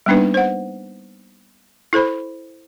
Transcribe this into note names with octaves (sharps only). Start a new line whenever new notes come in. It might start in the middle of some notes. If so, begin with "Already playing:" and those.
G3 A#3 B3 D4 D#4 B4
C5 F#5
E4 A4 C5 B5